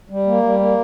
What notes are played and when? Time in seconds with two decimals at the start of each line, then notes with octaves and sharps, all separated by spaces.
0.10 G3
0.26 A#3
0.43 G3
0.60 A#3